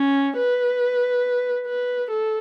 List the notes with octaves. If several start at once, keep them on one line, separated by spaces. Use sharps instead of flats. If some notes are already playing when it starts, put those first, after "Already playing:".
Already playing: C#4
B4
B4
A4